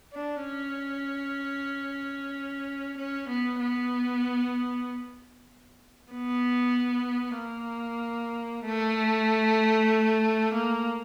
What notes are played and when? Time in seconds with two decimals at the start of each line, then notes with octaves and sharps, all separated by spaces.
0.13 D4
0.45 C#4
2.98 C#4
3.29 B3
3.60 B3
6.13 B3
7.38 A#3
8.65 A3
10.54 A#3